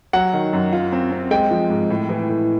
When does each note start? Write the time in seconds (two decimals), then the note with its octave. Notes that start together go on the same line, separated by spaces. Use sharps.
0.13 F#3 F#5
0.33 D#3
0.53 F#2
0.73 F4
0.92 C4
1.11 C4
1.31 G#3 G5
1.51 F3
1.70 G#2
1.90 A2
2.09 E3
2.29 A2